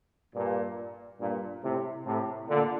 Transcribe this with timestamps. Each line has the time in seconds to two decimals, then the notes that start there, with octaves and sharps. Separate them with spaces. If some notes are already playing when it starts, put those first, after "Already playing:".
0.35 G2 A#2
1.20 G2 A#2
1.62 A2 C3
2.06 A2 C3
2.48 A#2 D3